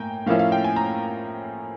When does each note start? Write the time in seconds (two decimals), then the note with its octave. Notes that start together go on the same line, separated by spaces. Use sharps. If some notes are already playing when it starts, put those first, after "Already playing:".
Already playing: A2 A#3 G5 G#5 A#5
0.26 A2 F3 A#3 C#4 E4 F5
0.39 F5
0.52 G5
0.64 G#5
0.76 A#5